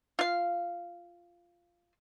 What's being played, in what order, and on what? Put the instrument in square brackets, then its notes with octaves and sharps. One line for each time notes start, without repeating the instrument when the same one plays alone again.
[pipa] F4 F5